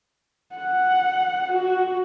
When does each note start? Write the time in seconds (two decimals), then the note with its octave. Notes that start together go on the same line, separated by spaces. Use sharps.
0.56 F#5
1.53 F#4